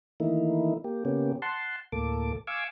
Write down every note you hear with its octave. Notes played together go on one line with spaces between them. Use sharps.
D#3 E3 A3 A#3 D#4 E4
A#3 G4
C#3 A#3 B3 C#4 G4
F#5 A5 C6
D2 A2 A#3 A4 D6
F5 G#5 C#6 D6 E6